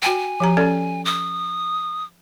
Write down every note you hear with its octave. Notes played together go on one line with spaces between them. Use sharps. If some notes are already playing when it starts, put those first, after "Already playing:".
F#4 G5 G#5
F3 G4 A#5
C#4 A4 D5
D#6